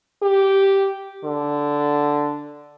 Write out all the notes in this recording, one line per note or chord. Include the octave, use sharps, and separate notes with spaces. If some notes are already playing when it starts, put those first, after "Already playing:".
G4
D3